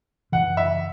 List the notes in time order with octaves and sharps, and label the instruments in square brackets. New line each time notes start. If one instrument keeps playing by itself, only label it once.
[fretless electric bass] F#2 C#3 E3 [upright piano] F#5
[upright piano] E5